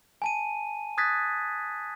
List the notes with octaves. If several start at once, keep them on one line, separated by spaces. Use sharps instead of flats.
G#5 A5 D#7
D#6 F#6 G#6 A6 B6